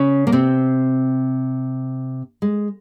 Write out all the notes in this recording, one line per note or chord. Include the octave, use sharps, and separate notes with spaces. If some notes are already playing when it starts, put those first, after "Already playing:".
Already playing: C#3 C#4
A#3
C3 C4
G#3